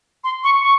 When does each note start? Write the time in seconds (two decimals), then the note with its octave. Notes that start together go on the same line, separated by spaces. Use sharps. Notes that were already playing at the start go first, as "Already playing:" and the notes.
0.24 C6
0.44 C#6
0.62 C#6